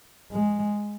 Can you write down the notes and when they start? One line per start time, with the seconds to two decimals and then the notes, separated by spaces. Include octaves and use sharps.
0.32 G#3